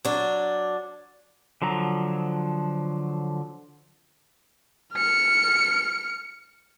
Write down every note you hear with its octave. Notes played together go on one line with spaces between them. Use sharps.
F#3 D4
D3 F3 F#3 A#5
F6 C#7